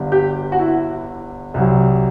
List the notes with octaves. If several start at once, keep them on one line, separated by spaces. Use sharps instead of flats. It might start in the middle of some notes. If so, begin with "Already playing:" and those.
Already playing: G1 G2 D3
G4
F#4
E4
C2 C3 F#3